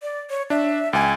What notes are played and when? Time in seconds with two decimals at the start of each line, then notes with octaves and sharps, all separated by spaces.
0.02 D5
0.30 C#5
0.50 D4 E5
0.93 C#2 G5 G#5